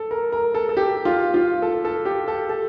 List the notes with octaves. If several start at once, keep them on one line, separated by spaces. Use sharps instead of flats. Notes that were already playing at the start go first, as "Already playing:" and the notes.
Already playing: A4
A#4
A#4
A4
A4
G4
F4
F4
A4
A4
G4
A4
A4